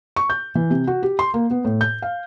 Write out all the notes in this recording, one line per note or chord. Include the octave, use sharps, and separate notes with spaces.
C#6
G6
E3
C3
F#4
G4
C6
A#3
B3
A2
G6
F5